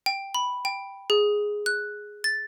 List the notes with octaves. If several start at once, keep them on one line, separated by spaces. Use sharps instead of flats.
G5
B5
G5
G#4
F#6
A6